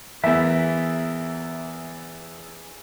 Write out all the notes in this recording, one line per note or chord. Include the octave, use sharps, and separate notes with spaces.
E2 E3 A#4 E5